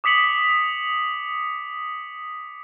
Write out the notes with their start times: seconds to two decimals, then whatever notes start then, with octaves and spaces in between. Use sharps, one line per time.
0.04 D6 D#6 B6 C#7 F#7